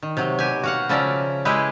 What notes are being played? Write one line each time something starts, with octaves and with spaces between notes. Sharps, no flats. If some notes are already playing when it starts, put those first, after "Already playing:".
D#3
C3 F#3
B2 G4 G#5
F#4 F5 F#5
C#3 F3 C#4 D5 E5 A#5
G#3 E4 G4 G#4 B4